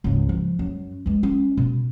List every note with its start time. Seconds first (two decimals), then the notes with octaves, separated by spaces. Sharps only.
0.04 C#2 G#2
0.29 F3
0.59 F#2
1.06 E3 G#3
1.23 C#4
1.57 B2